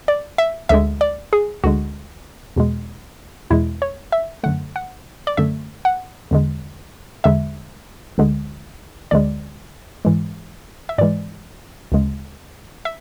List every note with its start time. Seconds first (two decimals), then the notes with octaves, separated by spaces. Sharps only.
0.08 D5
0.38 E5
0.69 D2 D3 G#3 E5
1.01 D5
1.33 G#4
1.64 D2 D3 G#3 F#4
2.56 E2 B2 G#3
3.50 E2 B2 G#3 E4
3.82 C#5
4.12 E5
4.43 F#2 D3 A3 F#5
4.76 F#5
5.27 D5
5.37 F#2 D3 A3 E5
5.85 F#5
6.31 E2 D3 G#3
7.24 E2 D3 G#3 E5
8.18 D2 D3 G#3
9.11 D2 D3 G#3 D5
10.05 G#2 E3 G#3
10.89 E5
10.98 G#2 E3 G#3 D5
11.92 D2 C#3 G#3
12.85 E5